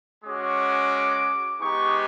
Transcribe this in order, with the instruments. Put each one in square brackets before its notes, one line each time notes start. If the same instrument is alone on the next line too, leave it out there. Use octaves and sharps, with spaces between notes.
[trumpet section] G#3 C#4 F#4 D6
G#3 B3 D#4 G4 C#6